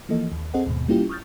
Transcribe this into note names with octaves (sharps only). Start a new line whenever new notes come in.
E3 F3 A#3 A4 D#5
D#2
C4 G#4 A4 C5 D#5 F#5
D#2 G#2 B2
G3 A#3 C#4 E4 F4 G4
C#6 D#6 F6 G6 A6